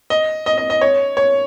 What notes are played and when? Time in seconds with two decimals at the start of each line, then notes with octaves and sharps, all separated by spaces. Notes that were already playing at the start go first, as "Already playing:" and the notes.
0.10 D#5
0.46 D#5
0.58 D#5
0.70 D#5
0.81 C#5
1.17 C#5